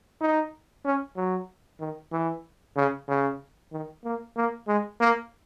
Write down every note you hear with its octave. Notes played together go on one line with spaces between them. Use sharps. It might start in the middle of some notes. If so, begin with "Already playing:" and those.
D#4
C#4
F#3
D#3
E3
C#3
C#3
D#3
A#3
A#3
G#3
A#3